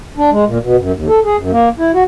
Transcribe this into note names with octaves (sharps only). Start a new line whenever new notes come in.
D4
G#3
A#2
B2
F#2
D#2
A4
G#4
F#2
A#3
E4
F#4